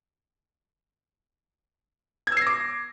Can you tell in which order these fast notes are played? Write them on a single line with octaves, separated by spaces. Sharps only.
G#6 E6 C7 A#6 D6